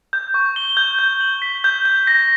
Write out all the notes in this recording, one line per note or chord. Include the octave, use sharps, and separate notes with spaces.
G6
C#6
G7
G6
G6
F#7
B6
G6
G6
A#6